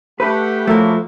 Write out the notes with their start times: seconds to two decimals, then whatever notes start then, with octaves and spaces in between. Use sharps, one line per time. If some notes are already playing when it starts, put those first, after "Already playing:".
0.20 A3 G4 B4 F#5
0.67 A2 F3 A3 A#3 F#4